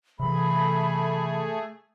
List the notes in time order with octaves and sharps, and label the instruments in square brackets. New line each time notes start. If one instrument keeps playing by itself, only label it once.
[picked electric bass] C3 E3 [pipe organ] A3 G#4 [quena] B5